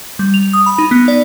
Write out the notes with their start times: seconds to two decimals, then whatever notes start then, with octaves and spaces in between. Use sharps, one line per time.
0.19 G3
0.34 F7
0.53 D#6
0.66 B5
0.78 D#4
0.91 B3
1.08 D5